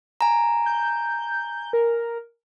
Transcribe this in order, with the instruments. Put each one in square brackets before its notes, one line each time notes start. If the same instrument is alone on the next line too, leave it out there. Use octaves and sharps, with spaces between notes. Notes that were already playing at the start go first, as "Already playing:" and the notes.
[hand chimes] G#5 A#5
[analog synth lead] G6
A#4